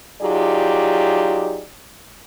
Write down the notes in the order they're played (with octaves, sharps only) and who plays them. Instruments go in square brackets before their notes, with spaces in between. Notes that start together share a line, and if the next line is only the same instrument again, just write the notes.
[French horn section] F#3 D#4 F4 G4 G#4 D5